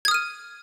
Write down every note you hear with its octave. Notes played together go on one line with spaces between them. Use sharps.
D#6 F6 G#6 D#7